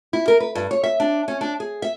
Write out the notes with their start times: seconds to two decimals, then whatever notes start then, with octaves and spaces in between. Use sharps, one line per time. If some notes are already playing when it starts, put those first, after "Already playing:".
0.13 E4
0.28 A#4
0.40 B4
0.55 G2
0.71 C#5
0.83 E5
1.00 D4
1.28 C#4
1.41 D4
1.60 G#4
1.82 E5